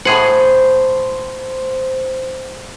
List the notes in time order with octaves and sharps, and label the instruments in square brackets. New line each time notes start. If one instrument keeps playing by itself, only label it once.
[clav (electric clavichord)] A2 G#4 F#5 [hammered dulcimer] C5